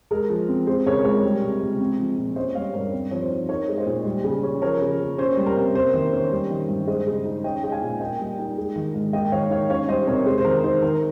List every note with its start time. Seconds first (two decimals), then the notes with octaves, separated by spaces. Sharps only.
0.11 G#3 A#4
0.30 F3
0.48 C4
0.67 G#3 C5
0.86 C#3 A#4 C#5
1.05 C#2 A#4 C#5
1.23 G3
1.42 C3
1.62 C#2
1.80 C4
1.98 F3
2.18 A#2
2.36 C#4 C5 D#5
2.55 G3 C#5 F5
2.74 G2 A#4 C#5
2.93 C4
3.11 F3 C#5
3.21 C5
3.30 D#4
3.49 D#4 A#4 C#5
3.68 G#3
3.77 C5 D#5
3.86 A#2
4.05 G3
4.24 C#3
4.43 C#4
4.62 F3 A#4 C#5
4.81 C#3
5.00 A#3
5.18 C#4 C5
5.37 G3
5.46 A#4
5.56 C3
5.75 A#3 C5
5.93 D#3
6.13 C#4
6.32 G3
6.50 D#3
6.69 G2
6.87 G#3 C5 D#5
7.07 C#3
7.25 D#4
7.44 C#4 D#5 G5
7.63 G#3 G5
7.72 F5 G#5
7.82 A#2
8.01 A#3 D#5 G5
8.20 G3
8.39 D#4
8.58 G#3
8.76 D#3
8.94 G#2
9.13 A#3 D#5 G5
9.25 G5
9.32 D#3 C#5 F5
9.50 D#4 C#5 F5
9.70 C#4 C#5 F5
9.88 G3 C5 D#5
10.07 C3 A#4 C#5
10.26 G#3 C5
10.38 C5
10.45 D#3 A#4
10.64 D#4 C5
10.82 D#3 A#4